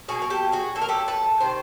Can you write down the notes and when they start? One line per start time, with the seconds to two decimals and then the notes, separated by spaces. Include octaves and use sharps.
0.08 B2 F#3 A#3 F#4 G#4
0.22 A#4
0.30 G4 A4
0.52 F#4 G#4
0.75 B2 F#3 A#3 A4
0.82 A#4
0.89 G4 A4
1.08 A4 B4
1.40 C3 D#3 C5